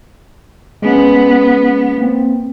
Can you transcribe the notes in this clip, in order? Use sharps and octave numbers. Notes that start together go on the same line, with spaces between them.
G#3 B3 C#4
A#3 C4